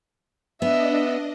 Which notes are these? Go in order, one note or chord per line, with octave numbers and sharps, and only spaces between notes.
B3 D4 D#5 E5